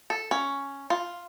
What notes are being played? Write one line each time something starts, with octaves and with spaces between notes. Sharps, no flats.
A4
C#4
F4